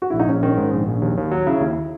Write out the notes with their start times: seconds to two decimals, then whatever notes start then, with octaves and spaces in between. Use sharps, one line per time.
0.02 F#4
0.10 A#1 E4
0.20 D#4
0.28 A#1 C#4
0.43 D#3 C#4
0.57 G#2
0.73 A#1
0.87 A#1
1.01 D#2
1.17 D#2
1.31 F#3
1.47 C#3 E4
1.61 D#2